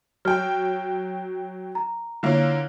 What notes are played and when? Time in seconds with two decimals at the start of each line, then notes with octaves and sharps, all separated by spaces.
0.25 F#3 G5 F6
1.75 A#5
2.23 D3 A#3 E4 F4 C#5